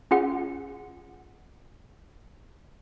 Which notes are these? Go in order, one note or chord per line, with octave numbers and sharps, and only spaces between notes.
C#4 F4 G#4 F#5